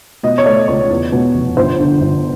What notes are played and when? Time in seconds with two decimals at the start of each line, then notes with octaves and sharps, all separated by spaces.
0.23 B2 D#5
0.38 C#5
0.46 A3 D5
0.68 C#2 C#5
0.90 E2
1.12 B2
1.35 F1
1.57 G1 C5
1.80 D3
2.01 G1